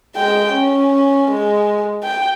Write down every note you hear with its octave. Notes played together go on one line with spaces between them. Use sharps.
G#3 G5
C#4
G#3
G5